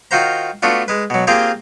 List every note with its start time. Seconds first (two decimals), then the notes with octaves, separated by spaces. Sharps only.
0.11 D#3 F4 F#4 C5 A#5
0.62 A3 B3 D4 F4 F#4
0.88 G#3 B4
1.10 B2 F#3
1.27 A#3 C4 F4 G4 G#4 G5